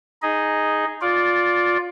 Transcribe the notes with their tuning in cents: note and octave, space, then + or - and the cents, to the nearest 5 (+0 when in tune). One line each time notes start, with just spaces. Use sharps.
D#4 +0 G#4 +0 D#5 +0
F4 +15 D5 -10